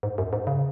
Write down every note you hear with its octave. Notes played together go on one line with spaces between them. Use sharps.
G#2
F#2
G#2
C#3